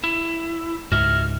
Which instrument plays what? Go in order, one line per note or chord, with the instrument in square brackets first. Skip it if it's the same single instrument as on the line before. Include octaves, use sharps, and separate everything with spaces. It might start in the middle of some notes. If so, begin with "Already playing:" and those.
[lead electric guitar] E4
[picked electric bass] C#2 G#2 [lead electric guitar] F#4 E5 [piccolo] F6